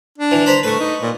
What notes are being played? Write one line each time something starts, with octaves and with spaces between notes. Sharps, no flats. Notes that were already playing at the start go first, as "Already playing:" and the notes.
D4
E3
C5 A#5 B5
A3 B4 C#6
D#4
A#2